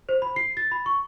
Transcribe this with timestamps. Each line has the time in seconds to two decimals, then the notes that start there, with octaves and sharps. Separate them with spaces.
0.09 C5
0.22 B5
0.36 C7
0.57 A6
0.71 B5
0.86 C#6